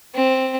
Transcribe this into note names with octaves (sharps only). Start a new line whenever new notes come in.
C4